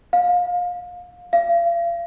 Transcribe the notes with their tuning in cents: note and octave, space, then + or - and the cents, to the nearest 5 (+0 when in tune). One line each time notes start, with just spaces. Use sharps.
F5 +30
F5 -40